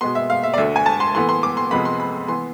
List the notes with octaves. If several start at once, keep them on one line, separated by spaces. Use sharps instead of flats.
B2 G#3 B3 C6
E5
F5
E5
D5
D2 D3 A3 E5
G#5
A5
C6
A2 E3 B3 C6
C6
D6
C6
F2 C3 G#3 B3 B5
C6
B5
E3 B3 C6